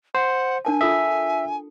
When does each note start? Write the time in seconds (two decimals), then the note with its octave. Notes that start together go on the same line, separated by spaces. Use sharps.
0.15 C5 F#5
0.65 D4 A#4 G#5 A5
0.81 F4 A4 E5 D#6